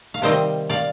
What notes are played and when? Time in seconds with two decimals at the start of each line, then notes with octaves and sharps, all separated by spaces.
0.14 F5
0.22 C3 D#3 G3 C4 C5 D#5
0.70 D5 F5